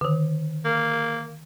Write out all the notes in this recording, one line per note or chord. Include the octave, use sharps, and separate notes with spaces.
D3 D#3
A#3